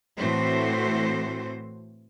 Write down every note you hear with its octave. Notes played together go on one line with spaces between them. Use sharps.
A2 E3 A3 C4 F#4 C5